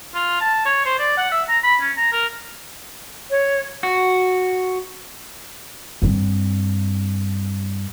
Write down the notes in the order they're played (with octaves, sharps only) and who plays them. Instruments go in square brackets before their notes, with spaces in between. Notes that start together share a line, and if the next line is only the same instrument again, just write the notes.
[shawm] F4
A5
C#5
C5
D5
F#5
E5
A#5
B5
C#4
A#5
A#4
[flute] C#5
[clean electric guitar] F#4
[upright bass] G2 C4